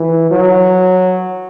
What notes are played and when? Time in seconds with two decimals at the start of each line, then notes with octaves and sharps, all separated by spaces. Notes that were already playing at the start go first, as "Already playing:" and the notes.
Already playing: E3
0.31 F#3